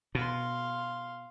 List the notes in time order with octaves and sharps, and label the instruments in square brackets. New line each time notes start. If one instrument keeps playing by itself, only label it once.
[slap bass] B2 [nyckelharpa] F5 C6